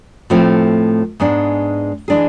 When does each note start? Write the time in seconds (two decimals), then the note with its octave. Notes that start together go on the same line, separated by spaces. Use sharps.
0.30 A2 F3 A3 C4
1.20 G#2 G#3 B3 D4
2.08 E3 G#3 D4 G#4